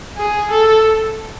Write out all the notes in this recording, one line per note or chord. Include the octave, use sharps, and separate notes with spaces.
G#4
A4